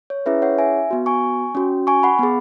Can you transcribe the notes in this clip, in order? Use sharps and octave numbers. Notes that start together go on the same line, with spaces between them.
C#5
C#4 E4 G#4 B4 E5
C#5 F#5
E5 G#5
B3 F#4
G#5 C#6
C#4 F#4
G#5 C#6
F#5 B5
B3 G#4